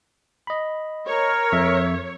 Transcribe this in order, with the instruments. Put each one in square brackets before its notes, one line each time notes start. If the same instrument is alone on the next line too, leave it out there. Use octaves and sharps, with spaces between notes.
[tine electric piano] D#5 B5
[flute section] A#4 [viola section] C#5
[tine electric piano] F2 E5